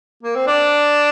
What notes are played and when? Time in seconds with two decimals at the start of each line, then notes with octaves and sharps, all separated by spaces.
0.23 A#3
0.36 C4
0.47 D4